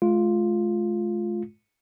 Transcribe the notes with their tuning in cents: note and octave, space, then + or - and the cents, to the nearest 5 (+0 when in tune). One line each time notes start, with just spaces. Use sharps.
G#3 +40 F4 +0